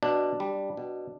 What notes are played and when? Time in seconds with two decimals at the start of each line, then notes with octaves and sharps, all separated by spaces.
0.03 B2 D4
0.40 G3
0.77 B2